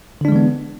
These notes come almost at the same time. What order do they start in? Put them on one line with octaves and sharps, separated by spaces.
D3 D4 G#3 E3 B3